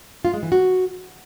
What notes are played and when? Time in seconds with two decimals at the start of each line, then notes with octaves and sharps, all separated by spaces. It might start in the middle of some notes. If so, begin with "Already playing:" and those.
0.25 F4
0.34 G#3
0.43 E3
0.52 F#4